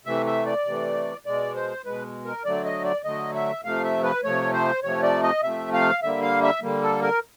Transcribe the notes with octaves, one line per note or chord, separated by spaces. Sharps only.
C3 E3 A3 E5
E5
D5
C3 E3 A3
B2 G#3 D5
C5
B2 G#3 B4
A#4
D3 F#3 A3 D5
D#5
D5
D3 F#3 A3 D#5
E5
C3 F3 A3 F5
E5
B4
C3 F3 A3 C#5
C5
C3 F3 A3 C#5
D5
D#5
C3 F3 A3 E5
F5
D3 G3 A#3 E5
F5
E5
D3 G3 A#3
A4
A#4